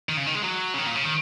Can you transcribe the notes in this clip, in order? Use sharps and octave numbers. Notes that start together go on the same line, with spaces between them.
D#3
C#3
D#3
G#3
F#3
C#3
D#3
A#2
C#3
D#3